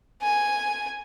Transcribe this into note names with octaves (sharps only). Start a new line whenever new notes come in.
G#5